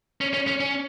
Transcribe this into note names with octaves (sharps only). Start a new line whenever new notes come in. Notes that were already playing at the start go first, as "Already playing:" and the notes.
C#4
C#4
C#4
C#4